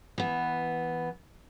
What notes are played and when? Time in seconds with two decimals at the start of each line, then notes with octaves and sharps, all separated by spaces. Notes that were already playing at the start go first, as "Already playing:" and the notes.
0.18 E3 B3